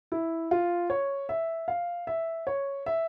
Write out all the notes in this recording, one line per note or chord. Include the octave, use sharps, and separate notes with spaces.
E4
F4
C#5
E5
F5
E5
C#5
E5